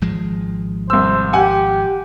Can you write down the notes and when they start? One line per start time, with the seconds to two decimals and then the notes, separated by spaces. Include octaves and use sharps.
0.02 G#1 F3 G#3
0.90 C2 C5 E6
1.33 G4 F#5 G#5